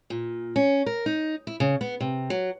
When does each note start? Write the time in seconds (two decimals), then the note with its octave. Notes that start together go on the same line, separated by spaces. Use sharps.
0.10 A#2
0.56 C#4
0.86 A#4
1.06 D#4
1.47 E4
1.60 C#3
1.81 B3
2.01 C3
2.30 F#3